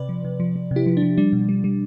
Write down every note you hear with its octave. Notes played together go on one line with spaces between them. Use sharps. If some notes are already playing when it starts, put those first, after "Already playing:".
Already playing: C3 B4 D5
F3
C3
F3
F3
C3
E4 G4
F3
D4
F3
G3 D4
B2
G3
G3